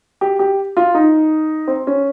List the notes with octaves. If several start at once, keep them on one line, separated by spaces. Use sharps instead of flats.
G4
G4
F4
D#4
C4
C#4